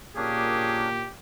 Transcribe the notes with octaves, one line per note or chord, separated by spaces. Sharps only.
A#2 A#3 C#4 D4 G4 G#4